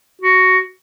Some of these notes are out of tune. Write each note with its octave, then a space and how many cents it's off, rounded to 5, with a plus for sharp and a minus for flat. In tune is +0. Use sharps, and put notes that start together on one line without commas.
F#4 +10